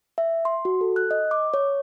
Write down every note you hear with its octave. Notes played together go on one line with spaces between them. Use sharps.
E5
C6
F#4
A4
F#6
D#5
D6
C#5